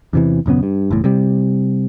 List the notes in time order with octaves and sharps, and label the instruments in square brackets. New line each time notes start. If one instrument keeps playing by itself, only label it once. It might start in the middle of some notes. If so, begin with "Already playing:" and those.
[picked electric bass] E2 C3 E3
D#1 F#2 C#3 B3
G2
F#1 E2 A2
C3 G3